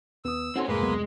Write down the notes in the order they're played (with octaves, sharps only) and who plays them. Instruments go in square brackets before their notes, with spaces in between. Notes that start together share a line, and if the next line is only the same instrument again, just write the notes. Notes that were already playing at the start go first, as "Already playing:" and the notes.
[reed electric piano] D#2 D#6 [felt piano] B3 [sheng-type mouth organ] E6
[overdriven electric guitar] C4 C#4 [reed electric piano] D#4 F#4 A4 [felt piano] F#5 C6
[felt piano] F1 [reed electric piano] G#2 [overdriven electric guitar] G#3 [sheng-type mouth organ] A#3 B4
[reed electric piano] C#2 F#3 B3